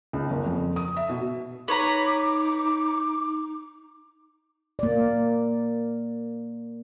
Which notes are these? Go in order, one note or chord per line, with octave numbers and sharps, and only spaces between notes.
C#2
F#1
F2
D#6
E5
B2
D#4 B4 C#5 A#5 D6
A#3 D5